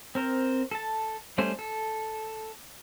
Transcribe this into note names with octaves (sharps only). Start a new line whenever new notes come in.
C4 A#4 C5
A4 A5
G3 A3 C#4 C5
A4